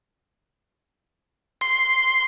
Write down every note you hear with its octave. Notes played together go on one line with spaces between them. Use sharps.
C6